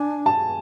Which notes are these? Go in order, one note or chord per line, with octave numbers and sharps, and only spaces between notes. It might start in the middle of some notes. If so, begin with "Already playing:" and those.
Already playing: D4 G#5
A5